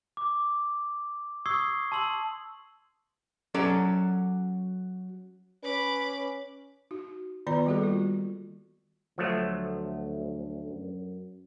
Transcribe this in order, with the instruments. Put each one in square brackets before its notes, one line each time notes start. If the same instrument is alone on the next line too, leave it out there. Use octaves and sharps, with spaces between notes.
[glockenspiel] D6
C#6 D#6 E6 G#6 C7 G7
A5 C6 E6 F#7
[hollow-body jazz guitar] F#3 C#4 A4 D5
[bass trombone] C#4 [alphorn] B4 [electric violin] B5 D6
[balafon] D#4 F#4
D#3 B3 F4 D5 A#5
G3 A#3 F#4 G#4 A4
G3 F4
[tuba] D2 [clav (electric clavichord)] F3 F#3 A3
[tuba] F#2